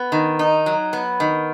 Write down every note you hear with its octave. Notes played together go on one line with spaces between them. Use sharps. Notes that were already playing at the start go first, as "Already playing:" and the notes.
Already playing: B3
D#3
D#4
F#3
B3
D#3